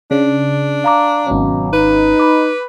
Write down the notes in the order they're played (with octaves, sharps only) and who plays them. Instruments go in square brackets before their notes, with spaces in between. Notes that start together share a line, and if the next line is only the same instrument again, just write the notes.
[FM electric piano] C#3 [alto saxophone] D4
[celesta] F5 A#5 D6
[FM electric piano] G#1 C#4 [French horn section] B2 F#3
[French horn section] D#4 [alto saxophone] B4
[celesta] B5 D6